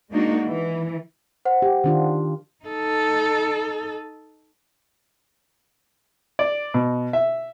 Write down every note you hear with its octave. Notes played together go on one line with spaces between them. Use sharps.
G#3 A#3 D4 D#4 F#4
E3
C5 F#5
G4
D#3 D4 F4
D#4 A4
D5
B2
E5